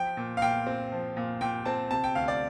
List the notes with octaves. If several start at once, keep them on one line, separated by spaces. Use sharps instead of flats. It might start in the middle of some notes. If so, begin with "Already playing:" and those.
Already playing: F3 G5
A#2
F5
A#2 G5
C4
F3
A#2
A#2 G5
C4 A5
C3 A5
G5
D2 F5
D5